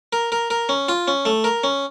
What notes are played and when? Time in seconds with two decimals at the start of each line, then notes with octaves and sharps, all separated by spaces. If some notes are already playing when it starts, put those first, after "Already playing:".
0.13 A#4
0.32 A#4
0.50 A#4
0.69 C#4
0.88 F4
1.08 C#4
1.25 A3
1.44 A#4
1.64 C#4